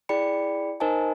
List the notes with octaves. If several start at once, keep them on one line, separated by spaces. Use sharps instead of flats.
E4 G#4 D5 G5 B5 C#7
D#4 A#4 C5 D#5 G#5 A5